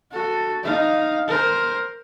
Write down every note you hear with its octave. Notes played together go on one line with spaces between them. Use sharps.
F#4 A4
D#4 F5
A#4 C5